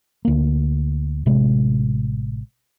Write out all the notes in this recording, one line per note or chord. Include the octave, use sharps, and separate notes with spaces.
D2 A#3
A1 C3 G#3